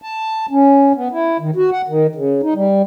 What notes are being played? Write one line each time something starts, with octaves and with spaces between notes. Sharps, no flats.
A5
C#4
B3
E4
D#3
F#4
F#5
D#3
C#3
D#4
G3